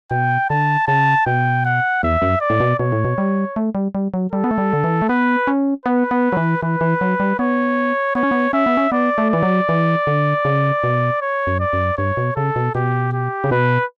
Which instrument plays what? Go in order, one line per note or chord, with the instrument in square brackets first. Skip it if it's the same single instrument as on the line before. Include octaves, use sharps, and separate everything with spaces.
[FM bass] B2 [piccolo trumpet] G5
[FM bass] D3 [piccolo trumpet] A5
[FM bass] C#3 [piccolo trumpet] A5
[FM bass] B2 [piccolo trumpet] G5
[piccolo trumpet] F#5
[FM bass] E2 [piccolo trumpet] E5
[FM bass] F#2
[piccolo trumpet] D5
[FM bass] A2
B2
[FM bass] B2 [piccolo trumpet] C#5
[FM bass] A2
B2
G3
A3
G3
G3
F#3
[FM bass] G3 [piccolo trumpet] A4
[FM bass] B3
A3
G3
D3
E3
A3
[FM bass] B3 [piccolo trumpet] B4
[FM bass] C#4
[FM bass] B3 [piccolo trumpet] B4
[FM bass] B3
F#3
E3
[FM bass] E3 [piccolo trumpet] B4
[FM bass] E3
F#3
G3
[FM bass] B3 [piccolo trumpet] C#5
[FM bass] B3 [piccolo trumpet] C#5
[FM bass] C#4
B3
[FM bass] C#4 [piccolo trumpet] E5
[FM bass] B3
C#4
[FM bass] B3 [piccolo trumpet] D5
[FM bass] A3
[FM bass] E3 [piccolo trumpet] D5
[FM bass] F#3
E3
D3
C#3
B2
[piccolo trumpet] C#5
[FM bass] F#2
[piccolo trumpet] D5
[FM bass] F#2
[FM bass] G2 [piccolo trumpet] C#5
[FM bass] B2
[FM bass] C#3 [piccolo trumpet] A4
[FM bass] B2
[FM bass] B2 [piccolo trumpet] G4
[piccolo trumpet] G4
[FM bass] C#3
[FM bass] B2 [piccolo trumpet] B4